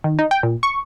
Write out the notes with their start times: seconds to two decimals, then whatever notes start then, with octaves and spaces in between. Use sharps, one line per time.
0.04 D#3
0.19 D#4
0.31 G5
0.43 A#2
0.63 C#6